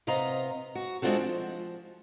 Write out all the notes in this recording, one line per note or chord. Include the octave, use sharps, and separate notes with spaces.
C3 B3 D#5 F5 A#5
F#4
G#3 C4 D4 F4 F#4 A4
F3